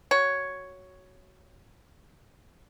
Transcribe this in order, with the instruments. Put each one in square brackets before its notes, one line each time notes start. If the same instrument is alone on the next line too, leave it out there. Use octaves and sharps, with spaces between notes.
[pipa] F#4 C#5